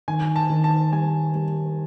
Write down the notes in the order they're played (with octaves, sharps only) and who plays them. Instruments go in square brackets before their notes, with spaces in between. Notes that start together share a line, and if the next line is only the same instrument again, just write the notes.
[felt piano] D#3 [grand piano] G#5
[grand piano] A5
[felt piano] D#3
[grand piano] A5
[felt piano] G3 [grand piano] G#5
[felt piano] G3